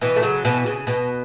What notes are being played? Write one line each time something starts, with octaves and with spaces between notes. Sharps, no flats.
B2 E3
A3
C#3 F#3
B2 E3
C#3
B2